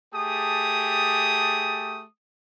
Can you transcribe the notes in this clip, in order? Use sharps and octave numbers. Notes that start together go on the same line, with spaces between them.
A3 G4 G#4 A5 D#6